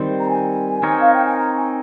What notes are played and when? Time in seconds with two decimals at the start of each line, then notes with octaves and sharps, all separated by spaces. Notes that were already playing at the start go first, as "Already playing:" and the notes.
Already playing: D#3 G3 C4
0.19 A#5
0.28 G#5
0.83 C4 D#4 A#4 C#5
1.00 F5
1.13 G5
1.25 G#5
1.38 A#5
1.56 G#5